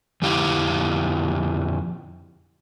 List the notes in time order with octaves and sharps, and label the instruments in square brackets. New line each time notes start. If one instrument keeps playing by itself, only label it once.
[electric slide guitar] F2 D3 E4 G4 F5